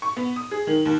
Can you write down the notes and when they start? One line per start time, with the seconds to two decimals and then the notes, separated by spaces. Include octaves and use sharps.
0.02 C#6
0.17 B3
0.36 D#6
0.51 G#4
0.67 D#3
0.85 D#2